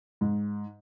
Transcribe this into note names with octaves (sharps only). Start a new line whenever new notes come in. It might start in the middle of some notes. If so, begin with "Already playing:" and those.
G#2